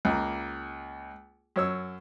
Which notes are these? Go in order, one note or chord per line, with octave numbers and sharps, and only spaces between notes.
C#2 A#3
F#2 C#5 E6